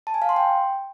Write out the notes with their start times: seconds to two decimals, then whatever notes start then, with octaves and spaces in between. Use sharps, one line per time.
0.07 A5
0.14 G#5
0.22 F5
0.29 C6
0.36 G5